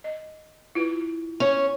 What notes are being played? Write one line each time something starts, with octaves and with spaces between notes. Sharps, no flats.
D#5
E4 F4 B4
C#4 C#5